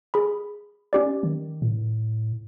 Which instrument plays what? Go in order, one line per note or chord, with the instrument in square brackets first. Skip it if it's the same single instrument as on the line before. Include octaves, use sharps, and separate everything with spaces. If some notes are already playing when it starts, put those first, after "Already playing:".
[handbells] G#4 B5
C#4 G4 D5
[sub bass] D#3
A2